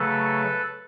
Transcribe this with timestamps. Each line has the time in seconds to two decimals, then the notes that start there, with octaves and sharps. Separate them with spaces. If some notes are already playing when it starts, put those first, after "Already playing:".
Already playing: C#3 F#3 A3 A4 B4